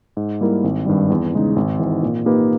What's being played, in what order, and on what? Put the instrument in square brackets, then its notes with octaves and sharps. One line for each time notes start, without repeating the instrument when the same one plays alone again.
[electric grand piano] G#2
G3 A#3 E4 A#4
G#1
G2 D#3 G3
E2
C#3 G#3 D#4
G#1
G#2 E3
A#2
A#3 D#4 G4 B4